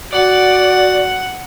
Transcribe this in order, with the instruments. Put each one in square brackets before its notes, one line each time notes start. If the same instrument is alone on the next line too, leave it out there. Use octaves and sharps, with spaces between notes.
[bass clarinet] F#4 [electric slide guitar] D5 [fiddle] F#5